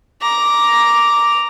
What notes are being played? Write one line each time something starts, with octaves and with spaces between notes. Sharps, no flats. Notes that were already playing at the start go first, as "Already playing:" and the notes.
A#5 D6